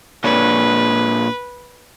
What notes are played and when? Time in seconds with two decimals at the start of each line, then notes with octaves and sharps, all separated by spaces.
0.24 A#2 D4 B4 C#5